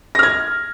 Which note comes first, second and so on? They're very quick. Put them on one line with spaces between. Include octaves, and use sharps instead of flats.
A#6 F6 G#6